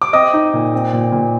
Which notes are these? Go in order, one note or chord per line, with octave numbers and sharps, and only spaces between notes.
D6
C4 D#5 D#6
D#4
A#2
C4
A#2
A#2